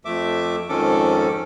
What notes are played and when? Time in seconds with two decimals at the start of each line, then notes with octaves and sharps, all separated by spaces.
0.05 F2 A3 E5 D6
0.69 F2 G#2 D#3 C#4 A4 D6